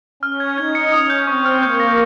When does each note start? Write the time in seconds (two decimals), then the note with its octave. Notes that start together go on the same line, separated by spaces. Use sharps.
0.23 C#4 F6
0.40 G#6
0.57 D#4 G#6
0.75 C#7
0.92 C#4 D#6
1.10 G6
1.27 C4 C#6
1.45 F6
1.62 A#3 G6
1.80 A#6